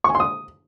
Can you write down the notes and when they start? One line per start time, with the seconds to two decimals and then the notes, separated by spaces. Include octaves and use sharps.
0.04 C#6
0.10 G#5
0.15 C6
0.20 D#6